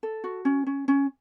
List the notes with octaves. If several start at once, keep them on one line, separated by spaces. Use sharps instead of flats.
A4
F#4
C#4
C#4
C#4